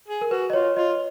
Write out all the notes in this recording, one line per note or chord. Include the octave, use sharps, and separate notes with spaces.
G#4
A#4
F#4 B4
D#5
F4 C#5
F4 D#5